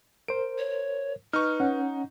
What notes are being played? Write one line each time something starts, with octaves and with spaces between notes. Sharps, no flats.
A#4 C5 D7
C#5
D#4 B4 C#6 F6
C#4 F#5